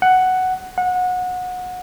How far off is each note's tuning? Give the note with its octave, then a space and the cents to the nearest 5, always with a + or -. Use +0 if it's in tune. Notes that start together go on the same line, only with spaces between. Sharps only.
F#5 +5
F#5 -25